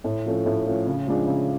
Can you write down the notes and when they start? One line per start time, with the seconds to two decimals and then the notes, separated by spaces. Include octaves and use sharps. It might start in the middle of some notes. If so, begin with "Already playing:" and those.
0.04 A2
0.26 F3 A3 C#4
0.46 A2
0.66 F3 A3 C#4
0.87 C#3
1.07 F3 G#3 D4
1.27 C#3